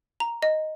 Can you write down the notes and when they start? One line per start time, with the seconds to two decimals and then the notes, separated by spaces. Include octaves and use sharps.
0.20 A#5
0.43 D#5